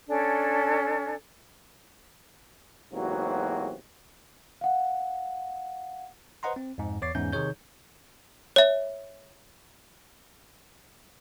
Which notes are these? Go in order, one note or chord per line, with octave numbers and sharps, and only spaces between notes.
C#4 D4 A4 G#5
E2 G#2 C3 F#3 A#3 F#4
F5 F#5
B4 C5 D#5 F#5 A#5 C6
C4
F2 G#2
E2 C#5 D6 A6 C7
E2 G#2 C#4 G6
C3 D#3 D#4 G#4 C#5 G6
C#5 E5